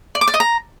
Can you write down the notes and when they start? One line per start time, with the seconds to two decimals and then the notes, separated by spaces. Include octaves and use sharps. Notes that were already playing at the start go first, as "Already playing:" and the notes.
0.15 D5
0.21 D6
0.28 D5
0.34 D#5
0.40 A#5